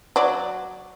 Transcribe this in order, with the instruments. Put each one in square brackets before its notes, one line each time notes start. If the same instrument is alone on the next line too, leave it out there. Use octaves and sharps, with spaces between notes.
[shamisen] F#3 D5